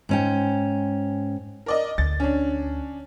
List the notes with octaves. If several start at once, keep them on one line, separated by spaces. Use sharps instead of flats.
G#2 C#4 G5
A#4 D5 D#5
D2 A6
C#4 D4